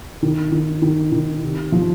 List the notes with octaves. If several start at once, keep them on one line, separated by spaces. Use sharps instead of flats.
D#3
D#3
D#3
D#3
C3
F3